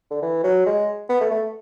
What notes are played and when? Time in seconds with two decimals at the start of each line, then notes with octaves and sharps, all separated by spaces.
0.11 D3
0.22 E3
0.44 F#3
0.66 G#3
1.09 B3
1.21 A3
1.31 A3